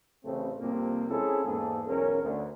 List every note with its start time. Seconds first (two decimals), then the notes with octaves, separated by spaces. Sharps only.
0.25 A1 C#3 A3 C4
0.60 C2 F2 C3 F3 A#3 C4
1.09 G#3 C4 C#4 E4 G#4 A4
1.45 E2 G#2 A#3 G#4 A4
1.87 B1 E2 C#4 A#4
2.22 D2